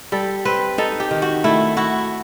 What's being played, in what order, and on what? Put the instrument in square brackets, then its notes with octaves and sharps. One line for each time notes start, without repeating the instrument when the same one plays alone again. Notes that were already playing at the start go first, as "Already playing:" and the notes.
[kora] G3 A4
C4 B4
D#4 A4
G4
D#3
F#4
A3 E4
E4 F#4